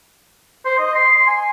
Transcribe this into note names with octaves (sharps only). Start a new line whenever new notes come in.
C5
D#5
C6
C6
G#5